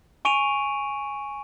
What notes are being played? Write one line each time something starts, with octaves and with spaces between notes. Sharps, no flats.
G#5 C#6 D7 D#7 F7